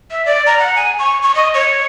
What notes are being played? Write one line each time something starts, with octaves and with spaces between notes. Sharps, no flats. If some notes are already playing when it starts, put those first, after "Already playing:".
E5
D5
A#5
F#5
G#5
C#6
C#6
D#5
C#5